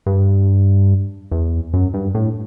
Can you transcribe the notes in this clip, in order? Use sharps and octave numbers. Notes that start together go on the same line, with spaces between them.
G2
E2
F#2
G2
A2